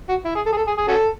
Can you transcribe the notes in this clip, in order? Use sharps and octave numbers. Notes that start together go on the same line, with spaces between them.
F#4
E4
G#4
A4
G#4
A4
G#4
G#4
C#4 F#4 A4